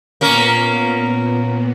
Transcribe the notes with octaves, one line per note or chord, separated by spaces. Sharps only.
A#2 A#3 B3 C#4 A#4